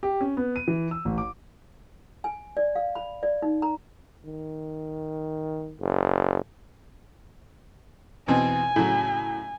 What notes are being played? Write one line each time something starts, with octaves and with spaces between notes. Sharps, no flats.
G4
C#4
B3
D#7
E3
E6
A1
D6
G#5
D5
F5
B5
D5
D#4
A#5
D#3
F#1
E2 B2 C4 G#5
A2 C#3 F#3